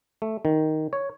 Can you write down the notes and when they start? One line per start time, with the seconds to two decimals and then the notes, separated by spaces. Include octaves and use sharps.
0.22 A3
0.45 D#3
0.93 C#5